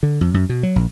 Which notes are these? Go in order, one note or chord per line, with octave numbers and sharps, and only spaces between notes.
D3
F2
F#2
B2
F#3
A#1